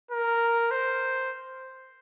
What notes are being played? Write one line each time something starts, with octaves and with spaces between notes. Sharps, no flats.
A#4
C5